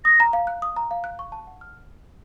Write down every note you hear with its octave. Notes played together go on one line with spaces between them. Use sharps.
D#6 A#6
A#5
F5
F#6
D#6
A#5
F5
F#6
C#6
A5
F#5
F6